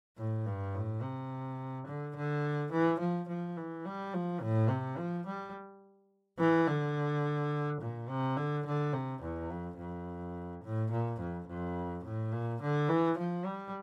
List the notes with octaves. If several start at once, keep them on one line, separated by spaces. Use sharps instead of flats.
A2
G2
A2
C3
D3
D3
E3
F3
F3
E3
G3
F3
A2
C3
F3
G3
E3
D3
A#2
C3
D3
D3
C3
E2
F2
F2
A2
A#2
F2
F2
A2
A#2
D3
E3
F3
G3